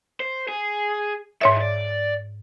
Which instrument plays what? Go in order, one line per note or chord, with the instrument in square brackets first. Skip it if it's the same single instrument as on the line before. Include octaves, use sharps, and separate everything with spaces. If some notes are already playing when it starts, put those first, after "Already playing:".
[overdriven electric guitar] C5
G#4
[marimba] G#2 C#5 E5 [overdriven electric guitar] D#3 E3
[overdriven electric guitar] D5